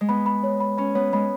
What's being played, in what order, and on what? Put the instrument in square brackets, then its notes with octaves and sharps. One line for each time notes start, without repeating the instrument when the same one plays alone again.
[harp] G#3
[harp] B3 [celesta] B5
[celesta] B5
C#5
B5
[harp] C#4 [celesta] B5
[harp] B3 [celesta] C#5
[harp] G#3 [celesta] B5